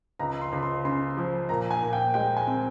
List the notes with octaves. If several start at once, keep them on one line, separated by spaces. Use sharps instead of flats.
C#2 A#5
C6
C#2
C6
C#3 C6
F3
A#2 A#5
G#5
A#2
G5
G#3 G5
G#5
C4